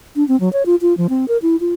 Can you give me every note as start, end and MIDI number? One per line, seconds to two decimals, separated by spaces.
0.16 0.26 62
0.28 0.39 60
0.40 0.51 54
0.53 0.65 73
0.66 0.75 65
0.81 0.96 65
0.97 1.07 53
1.09 1.28 60
1.28 1.37 70
1.42 1.56 64
1.60 1.74 65